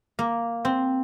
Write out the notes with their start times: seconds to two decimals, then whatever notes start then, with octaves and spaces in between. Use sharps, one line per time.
0.19 A#3
0.65 C4